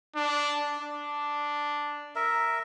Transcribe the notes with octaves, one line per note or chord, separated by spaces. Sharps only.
D4
D4
A#4 E5